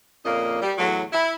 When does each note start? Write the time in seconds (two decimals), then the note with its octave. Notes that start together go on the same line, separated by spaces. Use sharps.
0.24 F2 A#2 C#3 A#3 D#5
0.62 G3
0.78 E2 A2 F#3
1.12 E4